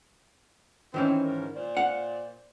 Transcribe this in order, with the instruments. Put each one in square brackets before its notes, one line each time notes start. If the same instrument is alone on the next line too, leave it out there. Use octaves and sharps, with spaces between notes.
[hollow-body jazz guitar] D#3 E3 C#4 [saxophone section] C4
[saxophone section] G#2 A#4
A#2 C5 D5
[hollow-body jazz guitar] F5 F#5